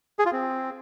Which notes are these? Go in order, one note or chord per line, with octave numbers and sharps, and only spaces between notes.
G#4
F4
C4